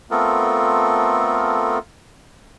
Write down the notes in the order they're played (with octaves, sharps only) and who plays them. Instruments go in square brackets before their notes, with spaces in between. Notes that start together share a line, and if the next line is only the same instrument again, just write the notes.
[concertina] A3 B3 C4 F4 A4 A#4